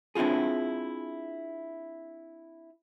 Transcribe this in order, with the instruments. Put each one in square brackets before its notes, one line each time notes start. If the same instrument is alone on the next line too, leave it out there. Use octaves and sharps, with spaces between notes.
[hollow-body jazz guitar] C4 D4 E4 F4 G#4